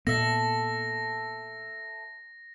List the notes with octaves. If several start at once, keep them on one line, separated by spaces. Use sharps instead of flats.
A#2 B3 A4 E5 A#6